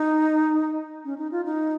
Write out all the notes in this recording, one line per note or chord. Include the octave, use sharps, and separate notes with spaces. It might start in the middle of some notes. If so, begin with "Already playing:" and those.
Already playing: D#4
C#4
D#4
F4
D#4